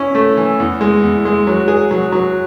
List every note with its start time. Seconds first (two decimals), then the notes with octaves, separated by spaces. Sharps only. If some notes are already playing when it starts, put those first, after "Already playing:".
Already playing: C#4 E4
0.15 A3
0.37 E3
0.60 E2
0.81 G#3
1.03 E2
1.25 G#3
1.47 F#3
1.68 G#4
1.91 F#3
2.12 F#3